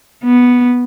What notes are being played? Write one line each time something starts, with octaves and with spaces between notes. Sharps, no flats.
B3